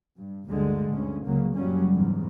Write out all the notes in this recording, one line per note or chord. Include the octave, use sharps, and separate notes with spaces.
G2
D2 G2 D3 G#3
D2 G2 C#4
C#2 C#3 F#3 A#3
F#1 F#2 C#3 F#3 G3 C#4
E2 G#2